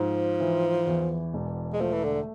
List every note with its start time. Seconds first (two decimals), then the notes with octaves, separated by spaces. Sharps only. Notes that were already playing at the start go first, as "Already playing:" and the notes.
Already playing: G#2 F3
0.40 E3
0.87 E2
1.34 E1
1.73 G#3
1.80 F3 A3
1.92 E3
2.04 D3